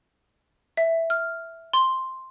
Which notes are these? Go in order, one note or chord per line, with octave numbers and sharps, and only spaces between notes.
E5
F6
C6